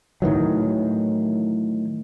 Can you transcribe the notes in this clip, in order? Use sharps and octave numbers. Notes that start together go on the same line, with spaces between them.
A2 D#3 E3 F#3